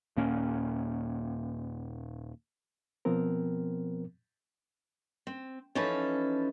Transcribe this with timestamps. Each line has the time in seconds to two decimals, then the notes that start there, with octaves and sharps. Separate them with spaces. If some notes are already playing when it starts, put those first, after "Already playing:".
0.17 D#2 A#2 A#3 C#4
3.05 B2 F3 B3 C4 A#4
5.27 C4
5.75 E3 F3 C#4 D#4 A4 B4